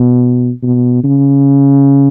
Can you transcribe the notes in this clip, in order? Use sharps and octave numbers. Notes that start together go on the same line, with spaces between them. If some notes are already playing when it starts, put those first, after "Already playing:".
Already playing: B2
B2
C#3